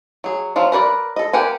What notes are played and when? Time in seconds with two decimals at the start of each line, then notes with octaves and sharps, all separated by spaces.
0.24 F#3 G#4
0.56 F3 F#3 F4
0.72 A#4 B4 C#5 D5
1.16 A4 D#5
1.33 A#3 G4 A#4 F#5 G#5